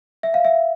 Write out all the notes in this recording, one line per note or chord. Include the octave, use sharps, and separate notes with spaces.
E5
F5
E5